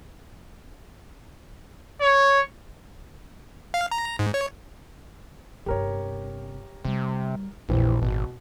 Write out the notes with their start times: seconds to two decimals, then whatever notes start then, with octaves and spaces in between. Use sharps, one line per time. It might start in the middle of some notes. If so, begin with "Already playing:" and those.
2.01 C#5
3.74 F5
3.91 A#5
4.19 G#2
4.34 C#5
5.66 G1 C3 G4 A#4 C#5
6.85 C3 G3
7.69 F1 A#1 E2 A#2 E3 C4
8.02 G#1 B2